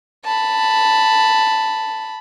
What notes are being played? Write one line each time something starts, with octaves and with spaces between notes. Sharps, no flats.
A5 B5